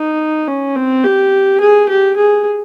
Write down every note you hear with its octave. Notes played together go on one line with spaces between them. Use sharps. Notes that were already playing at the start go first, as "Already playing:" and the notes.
Already playing: D#4
C#4
C4
G4
G#4
G4
G#4